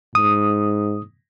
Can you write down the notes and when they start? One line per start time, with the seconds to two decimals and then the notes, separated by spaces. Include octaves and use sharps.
0.15 G#2 D#6